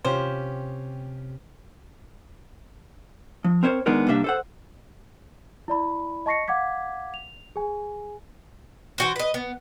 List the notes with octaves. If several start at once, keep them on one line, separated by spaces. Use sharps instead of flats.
C3 C#4 F4 G4 C5
F3
C4 A#4 C5 C#5
D#3 G#3 B3 D4 D#4 A#4
C2 G3 A#3 D4 E5
A4 C5 F#5
E4 D5 B5
D#5 A5 C#6 A#6 C7 C#7
F5 F#5 D6 G#6 B6
F7
G#4 G#5
E3 F#4 C5
B4 D#5
B3